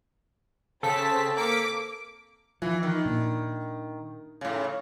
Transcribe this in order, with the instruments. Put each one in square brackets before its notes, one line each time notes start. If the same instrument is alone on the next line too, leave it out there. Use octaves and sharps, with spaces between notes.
[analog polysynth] C#3 B6 [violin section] C4 A5 [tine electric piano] A4
[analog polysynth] A#3 B6 C#7 [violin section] D6
[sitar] E3 [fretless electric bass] F3
[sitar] D#3
[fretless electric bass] A#2 D4
[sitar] A2 C#3